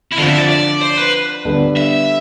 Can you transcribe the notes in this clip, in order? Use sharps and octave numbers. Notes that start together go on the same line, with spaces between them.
E4
D3 F3 C4 F4
E5
D5
D5
C5
B4
D3 G3 B3 D4 A4
E5